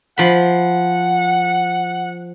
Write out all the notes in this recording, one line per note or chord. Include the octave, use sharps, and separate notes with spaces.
F3 F#5 B5